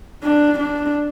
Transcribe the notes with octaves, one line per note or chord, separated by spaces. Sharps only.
D4
D4